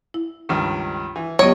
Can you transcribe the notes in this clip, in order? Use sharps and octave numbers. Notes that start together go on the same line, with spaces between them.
E4
C#2 G2 D#3
E3
C#2 F#3 B3 G4 C#5 D#5